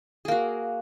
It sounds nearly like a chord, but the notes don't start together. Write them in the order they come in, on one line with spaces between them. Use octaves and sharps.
G#4 A#3 F#4